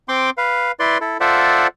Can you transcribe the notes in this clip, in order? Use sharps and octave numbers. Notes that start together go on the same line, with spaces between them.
C4 G5 C6 D6
B4 F5
E4 B4 D5 C6
E4 A4
F4 A4 C5 D5 E5 F#5